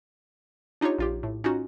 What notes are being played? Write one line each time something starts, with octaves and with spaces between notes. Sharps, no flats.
D4 D#4 F4 G4 C#5
A#1 F4 G4
A2
C#4 D#4 F4 F#4